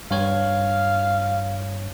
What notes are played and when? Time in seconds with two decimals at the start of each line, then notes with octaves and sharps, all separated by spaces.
0.11 G2 C#5 F5 G#6